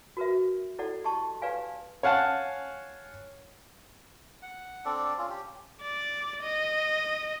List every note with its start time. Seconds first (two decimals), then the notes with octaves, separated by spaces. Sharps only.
0.17 F#4 A#4 B4 E5
0.79 E4 A4 D5 F#5
1.04 G4 D#5 A5 C#6
1.42 G4 B4 D5 F5 G#5
2.03 C#5 F5 F#5 G#5 A5
4.42 F#5
4.85 C4 D4 A4 D5
5.18 C#4 F4
5.29 G4
5.82 D5
6.42 D#5